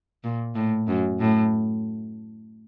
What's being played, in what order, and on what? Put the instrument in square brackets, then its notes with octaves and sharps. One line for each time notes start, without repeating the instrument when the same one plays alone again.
[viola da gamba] A#2
A2
F#2
A2